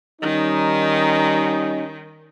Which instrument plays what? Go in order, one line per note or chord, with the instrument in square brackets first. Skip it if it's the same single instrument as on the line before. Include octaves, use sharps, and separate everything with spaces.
[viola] D#3 [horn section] G3 C#4 D#4